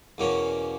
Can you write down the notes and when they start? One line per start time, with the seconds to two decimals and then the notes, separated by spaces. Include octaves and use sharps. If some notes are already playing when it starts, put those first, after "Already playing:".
0.18 E2 B2 A#3 C#4